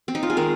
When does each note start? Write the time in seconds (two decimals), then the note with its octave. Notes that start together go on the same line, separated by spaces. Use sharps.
0.08 C4
0.15 D#4
0.23 F4
0.30 G#4
0.37 D#3 G#3 A#4